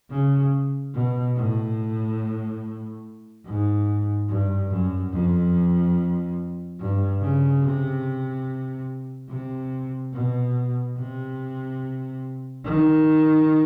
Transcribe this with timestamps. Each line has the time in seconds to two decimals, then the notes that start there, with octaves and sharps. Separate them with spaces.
0.11 C#3
0.94 B2
1.36 A2
3.45 G#2
4.29 G2
4.70 F#2
5.12 F2
6.79 G2
7.21 C#3
7.62 C3
9.30 C3
10.14 B2
10.97 C3
12.64 D#3